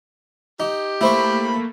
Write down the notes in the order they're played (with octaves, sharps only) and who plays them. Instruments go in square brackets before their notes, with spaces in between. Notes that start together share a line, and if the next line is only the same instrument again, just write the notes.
[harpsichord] D#4 [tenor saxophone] G4
[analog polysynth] A3 A#3 [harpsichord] E4 C5 C#6 [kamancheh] B5